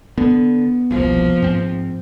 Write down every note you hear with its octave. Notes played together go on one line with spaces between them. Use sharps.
D3 B3
E1 C2 F3 A#3
G#2 C4